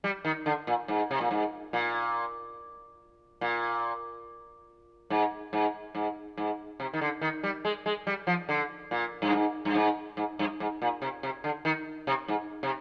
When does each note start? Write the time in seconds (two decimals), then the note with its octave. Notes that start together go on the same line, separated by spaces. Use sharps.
0.04 G3
0.25 D#3
0.46 D3
0.67 A#2
0.88 G#2
1.11 C3
1.21 A#2
1.31 G#2
1.73 A#2
3.41 A#2
5.10 G#2
5.53 G#2
5.95 G#2
6.37 G#2
6.80 C3
6.93 D#3
7.01 D3
7.21 D#3
7.43 G3
7.65 G#3
7.86 G#3
8.07 G3
8.27 F3
8.49 D3
8.91 A#2
9.22 G2
9.33 G#2
9.65 G2
9.75 G#2
10.17 G#2
10.39 G2
10.60 G#2
10.82 A#2
11.02 C3
11.23 C3
11.44 D3
11.65 D#3
12.07 C3
12.28 G#2
12.63 C3